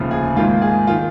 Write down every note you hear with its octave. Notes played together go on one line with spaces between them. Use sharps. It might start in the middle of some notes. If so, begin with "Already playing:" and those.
Already playing: F1 D#2 C#3 F3
G#4
G#2 D#3 A#3 F4
G#4
D#3 F4